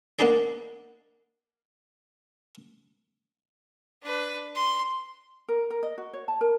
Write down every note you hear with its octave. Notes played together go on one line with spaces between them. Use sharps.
A#3 B3 D4 D#4 G#4 D5
D4 B4
C6
A#4
A#4
D#5
F#4
C#5
A5
A#4